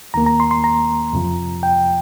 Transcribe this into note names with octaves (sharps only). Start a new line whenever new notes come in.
D#2 D#3 A#3 A#5
A#5
C6
C6
A#5
F2 C3 F3
G5